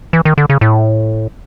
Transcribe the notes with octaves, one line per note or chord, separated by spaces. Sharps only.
E3
D#3
D3
C#3
A2